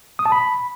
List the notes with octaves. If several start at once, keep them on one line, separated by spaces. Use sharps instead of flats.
D#6
A5
B5